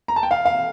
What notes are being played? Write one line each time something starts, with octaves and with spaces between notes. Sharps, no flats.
A#5
A5
G5
F5
F5